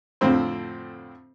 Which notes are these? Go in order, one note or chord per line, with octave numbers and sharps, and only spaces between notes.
F2 A2 D3 C4 C5